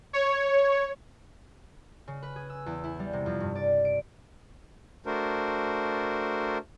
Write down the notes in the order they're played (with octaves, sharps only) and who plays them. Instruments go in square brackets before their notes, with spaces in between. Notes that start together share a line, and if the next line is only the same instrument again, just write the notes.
[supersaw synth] C#5
[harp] C#3
B4
G#4
E6
E2
E4
G3
C3
F2
G2
D5
D7
[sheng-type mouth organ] A3 D4 F#4 A#4 C5